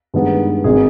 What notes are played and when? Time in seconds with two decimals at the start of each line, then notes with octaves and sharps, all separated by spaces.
0.14 G2 D#3 G#3 B3
0.64 G#1 D#3 G#4